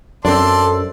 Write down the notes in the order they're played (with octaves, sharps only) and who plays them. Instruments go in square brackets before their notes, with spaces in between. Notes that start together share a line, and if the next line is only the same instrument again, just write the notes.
[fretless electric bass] F#2 [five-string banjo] C4 D4 [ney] A4 [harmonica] D5 A5 C6